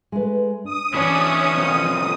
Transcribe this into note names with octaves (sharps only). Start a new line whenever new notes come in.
G#3 A3 B4
D4 D#6
E3 C#4 D4 E4
C2 F2